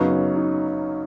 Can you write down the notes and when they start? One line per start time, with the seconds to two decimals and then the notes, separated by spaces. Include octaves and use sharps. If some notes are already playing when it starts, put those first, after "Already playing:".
Already playing: F#2 C#3 F#3 B3 D#4
0.35 D#4